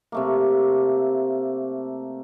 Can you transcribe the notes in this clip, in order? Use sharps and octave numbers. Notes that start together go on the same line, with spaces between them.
C3 A3 A#3